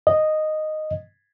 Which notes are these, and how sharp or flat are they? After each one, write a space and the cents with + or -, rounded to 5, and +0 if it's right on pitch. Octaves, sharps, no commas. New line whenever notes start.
D#5 -5